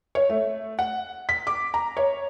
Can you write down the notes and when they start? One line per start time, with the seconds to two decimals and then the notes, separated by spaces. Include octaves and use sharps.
0.15 C#5
0.30 A3
0.79 F#5
1.29 B6
1.47 D6
1.74 A#5
1.97 C#5